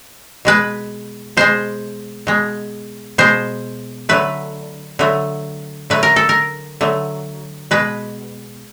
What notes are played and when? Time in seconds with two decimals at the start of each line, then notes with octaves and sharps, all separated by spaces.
0.45 B2 G#3 B4
1.37 B2 G#3 C5
2.27 B2 G#3
3.18 B2 G#3 C5
4.09 D3 F#3 A3 B4
4.99 D3 F#3 A3
5.90 D3 F#3 A3 B4
6.03 A#4
6.16 A4
6.29 A#4
6.81 D3 F#3 A3
7.71 B2 G#3 B4